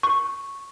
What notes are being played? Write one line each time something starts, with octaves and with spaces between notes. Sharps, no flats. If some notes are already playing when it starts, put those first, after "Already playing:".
C#6